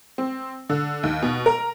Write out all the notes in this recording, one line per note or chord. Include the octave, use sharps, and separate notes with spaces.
C4
D3
D#2
B2
A#4